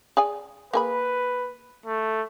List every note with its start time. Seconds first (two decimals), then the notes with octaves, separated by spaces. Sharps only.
0.17 G#4 D5 G#5
0.73 A#3 G#4 B4 B5
1.86 A3